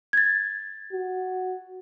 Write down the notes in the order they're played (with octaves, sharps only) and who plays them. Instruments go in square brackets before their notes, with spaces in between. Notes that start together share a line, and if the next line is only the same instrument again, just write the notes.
[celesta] G#6 A6
[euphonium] F#4